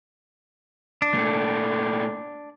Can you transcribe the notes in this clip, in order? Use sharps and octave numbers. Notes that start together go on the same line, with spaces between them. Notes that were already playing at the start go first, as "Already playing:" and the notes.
D4
A#2 A3